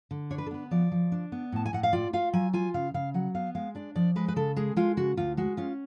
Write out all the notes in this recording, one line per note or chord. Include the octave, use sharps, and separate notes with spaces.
D3
D4 C#5
B4
A4
B3 B4
F3 D5
F3
D4
B3
A2 A5
G#5
A2 F#5
F5
F4 D5
F4 F5
F#3 G#5
F4 G#5
C#3 F5
C#3 F5
F#3 F#5
B3 F5
G#3 F5
D4 D5
F3 D5
G#3 B4
B4
C#3 A4
G#3 G#4
G#3 F4
C#3 F#4
D2 F4
G#3 F#4
C#4 F4